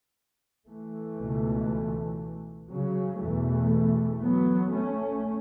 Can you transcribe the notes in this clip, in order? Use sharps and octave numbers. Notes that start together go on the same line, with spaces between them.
E3 A3
C#2 B2
C#3 F#3
E2 B2 E3 A3
F#3 B3
A3 C#4